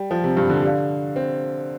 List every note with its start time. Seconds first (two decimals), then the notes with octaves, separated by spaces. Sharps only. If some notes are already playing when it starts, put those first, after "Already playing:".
Already playing: G3 G4 D5 G5
0.11 F3
0.24 C3
0.37 G2
0.50 D3
0.63 G4 D5 F5
1.16 C4